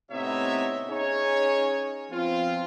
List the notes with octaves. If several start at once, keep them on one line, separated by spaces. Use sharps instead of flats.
A2 C3 B3 D#4 C#5 E5
C#4 D#4 G#4 C#5
F3 B3 C4 F4